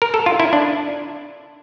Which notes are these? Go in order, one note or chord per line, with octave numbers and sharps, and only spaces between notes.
A#4
A4
F4
E4
D4